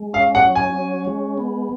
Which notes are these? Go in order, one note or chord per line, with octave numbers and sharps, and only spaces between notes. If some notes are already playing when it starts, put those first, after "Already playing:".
Already playing: G#3
C#4 F5
F#5
F#3
G#5
C#4
G#3
B3